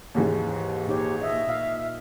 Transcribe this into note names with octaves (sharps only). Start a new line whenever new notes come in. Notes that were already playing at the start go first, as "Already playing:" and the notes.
D#2 G#2 E3
A#2 D#4 G4 C#5
D#5 E5
A#2 F5